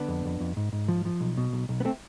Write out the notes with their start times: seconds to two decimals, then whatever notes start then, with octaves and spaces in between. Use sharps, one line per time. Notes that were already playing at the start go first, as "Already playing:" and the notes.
Already playing: D3 B3 D4
0.08 F2
0.25 F2
0.40 F2
0.57 G#2
0.73 G#2
0.88 F3
1.05 F3
1.21 B1
1.37 B2
1.53 B1
1.69 B1
1.80 B3
1.85 A3 C4